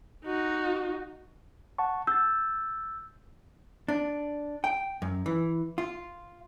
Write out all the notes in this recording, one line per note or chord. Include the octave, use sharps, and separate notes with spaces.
D#4 F#4
F#5 A5 C#6
E6 G6 A6
D4
G5
F#2
E3
F4